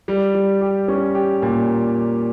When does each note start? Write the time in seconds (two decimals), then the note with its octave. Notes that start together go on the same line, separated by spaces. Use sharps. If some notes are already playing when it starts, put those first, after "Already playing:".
0.08 G3
0.35 G3
0.61 G4
0.88 C#4
1.15 G4
1.42 A#2